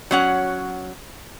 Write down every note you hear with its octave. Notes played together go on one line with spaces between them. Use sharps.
F#3 C#4 F#5